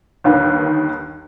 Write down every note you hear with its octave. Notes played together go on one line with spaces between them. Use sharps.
G1 D#2 D#3 B4